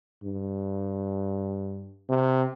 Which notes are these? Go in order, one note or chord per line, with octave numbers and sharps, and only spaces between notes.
G2
C3